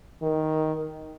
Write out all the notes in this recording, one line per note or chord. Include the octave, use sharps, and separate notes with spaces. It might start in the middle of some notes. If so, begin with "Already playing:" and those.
D#3